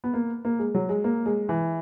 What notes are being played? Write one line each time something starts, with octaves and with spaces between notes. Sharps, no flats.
B3
A#3
A#3
G#3
F#3
G#3
A#3
G#3
E3